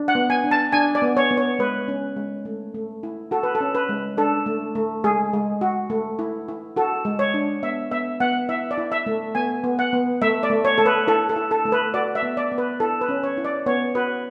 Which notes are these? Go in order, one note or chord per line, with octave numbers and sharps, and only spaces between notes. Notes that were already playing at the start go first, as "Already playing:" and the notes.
Already playing: D4
F#5
B3
G#5
D4
A5
D4 G#5
D5
B3
C#5
B3
C#5
G#3 B4
C#4
G#3
A3
A3
E4
F#4 A4
B4
A4
C#4
B4
G#3
D4 A4
A3
A3
G#3 G#4
G#3
F#4
A3
E4
E4
F#4 A4
G#3
C#5
D4
B3 E5
B3 E5
B3 F#5
E4 E5
D5
E4
E5
A3
B3 G#5
B3
F#5
B3
A3 E5
D5
A3
C#5
A3 A4
B4
E4 A4
A4
E4
A4
A3
B4
F#4 D5
E5
B3
D5
B3
B4
E4 A4
B4
C#4
C#5
E4
D5
B3 C#5
F#4 B4